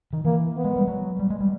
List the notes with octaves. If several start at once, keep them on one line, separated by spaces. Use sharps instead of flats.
D#3
E3 A#3
B3
G#3
G3
F#3
G3
G#3
G3